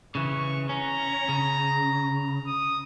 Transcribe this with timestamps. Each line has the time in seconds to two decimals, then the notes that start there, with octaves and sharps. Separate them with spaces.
0.15 C#3 E3 C#6
0.69 C#4 A#5
1.29 C#3
2.47 D#6